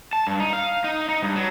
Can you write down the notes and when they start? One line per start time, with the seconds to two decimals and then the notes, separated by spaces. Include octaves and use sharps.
0.13 A5
0.27 G2
0.40 D#4
0.53 F5
0.84 D#4
1.09 D#4
1.22 G2
1.36 F#3